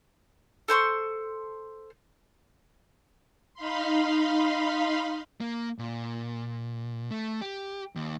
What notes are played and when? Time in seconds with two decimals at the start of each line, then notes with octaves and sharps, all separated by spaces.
0.68 A4 C5 C6 C#6
3.54 D#4 F5 B5 C6
5.41 A#3
5.78 A#2
7.11 A3
7.41 G4
7.96 D#2